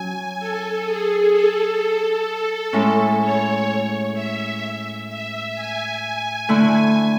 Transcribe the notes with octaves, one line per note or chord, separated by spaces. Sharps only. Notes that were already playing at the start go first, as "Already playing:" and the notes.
Already playing: F#3 C#4 G#5
A4
G#4
A4
A2 G#3 C#4 E4
C#5
E5
E5
G#5
G#5
D3 A3 E4 G#5